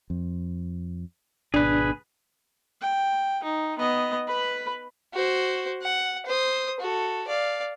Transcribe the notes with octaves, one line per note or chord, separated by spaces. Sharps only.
F2
G#1 B2 D4 G#4 B4
G5
D#4
B3 D#5
B4 B5
F#4 C5
F#5
C5 D#6
F#4 A4
D5 F5